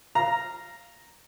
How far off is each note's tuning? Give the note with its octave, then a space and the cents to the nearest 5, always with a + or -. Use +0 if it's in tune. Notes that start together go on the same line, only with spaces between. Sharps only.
F5 -15 A#5 +0